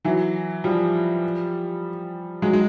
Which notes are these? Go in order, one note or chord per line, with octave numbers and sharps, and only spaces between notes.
E3 F#3
F3 G3
F#3 G#3
G#3